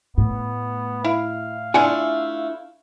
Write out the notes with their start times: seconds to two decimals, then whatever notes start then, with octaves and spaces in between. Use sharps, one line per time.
0.18 A2 B3
1.04 E4 F5
1.74 A3 D4 E4 F4 F#5 G#5